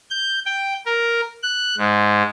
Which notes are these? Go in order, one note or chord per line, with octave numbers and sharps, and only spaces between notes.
G6
G5
A#4
F#6
G#2